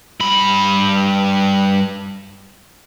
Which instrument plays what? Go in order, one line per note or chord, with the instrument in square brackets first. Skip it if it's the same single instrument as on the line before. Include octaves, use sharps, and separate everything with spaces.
[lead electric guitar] G2 B5